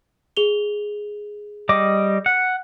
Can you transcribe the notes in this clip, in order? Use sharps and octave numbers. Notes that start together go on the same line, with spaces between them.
G#4 F7 G7
G3 D#5 D6
F#5